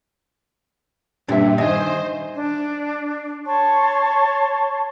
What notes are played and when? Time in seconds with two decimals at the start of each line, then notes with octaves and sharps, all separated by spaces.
1.28 G2 A#2 D3 D4 G4 E5
1.58 D#3 C5 D#5 E5 G#5
2.35 D4
3.46 C#5 A5 C6 C#6